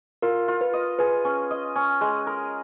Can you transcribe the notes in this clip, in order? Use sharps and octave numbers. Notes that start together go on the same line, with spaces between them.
F4 A#4
F4
B4
D#5
G#4 B4
C#4
D#5
C#4
G#3
A#4